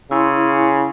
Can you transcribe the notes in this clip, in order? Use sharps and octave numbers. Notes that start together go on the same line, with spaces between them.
C#3 E4 C6